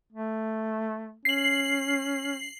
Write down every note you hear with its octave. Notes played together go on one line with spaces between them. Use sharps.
A3
C#4 C7 F#7